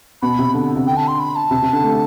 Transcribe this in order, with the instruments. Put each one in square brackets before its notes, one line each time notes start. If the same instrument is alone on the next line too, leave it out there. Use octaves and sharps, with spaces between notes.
[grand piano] B2 [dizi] B5
[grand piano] C3
D3
C3
[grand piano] D3 [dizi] G5
[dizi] A5
C6
B5
A5
[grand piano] C3
C3
D3
A3